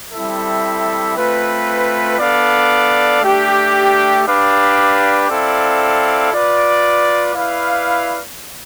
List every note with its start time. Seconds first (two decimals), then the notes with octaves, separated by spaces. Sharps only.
0.13 G3 C4 E4 A4 E5
1.15 A3 C4 F4 B4
2.19 B3 D4 A4 D5 F5
3.21 A3 D4 G4
4.25 D4 G4 B4 D5 F5
5.27 C4 E4 A4 D5 F5
6.31 F4 B4 D5
7.33 E4 B4 D5 F5